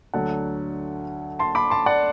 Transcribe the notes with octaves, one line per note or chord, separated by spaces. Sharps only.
D2 D3 F#3 F#5 A5
A5 C6
B5 D6
A5 C6
D5 F#5